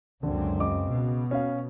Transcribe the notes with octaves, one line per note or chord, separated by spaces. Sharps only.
C#2 F#2 D3 C4
C#3 D#5 D6
B2
C#4 F5